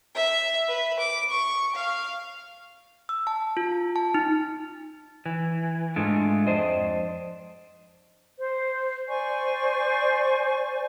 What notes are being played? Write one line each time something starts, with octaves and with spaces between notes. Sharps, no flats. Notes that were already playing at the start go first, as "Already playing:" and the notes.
E5
B4
D6
C#6
F5
E6
A5
F4
A5
D#4
E3
G#2 G#3 A3 D4 F4
F2 D4 C5 D#5
C5
C5 D5 G#5 C#6